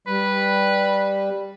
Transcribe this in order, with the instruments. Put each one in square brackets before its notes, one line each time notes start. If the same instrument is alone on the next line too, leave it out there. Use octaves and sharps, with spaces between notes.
[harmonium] G3 [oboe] B4